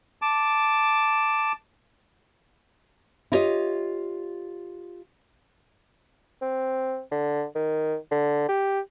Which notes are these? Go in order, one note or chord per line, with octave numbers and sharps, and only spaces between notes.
A5 D6
E4 F4 G4 C#5 D#5
C4
D3
D#3
D3
G4